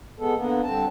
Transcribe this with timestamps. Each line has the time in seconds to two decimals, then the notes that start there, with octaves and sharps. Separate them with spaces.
0.19 G#3 B3 A4
0.35 D3 A#3 B3
0.63 G2 D3 C4 A5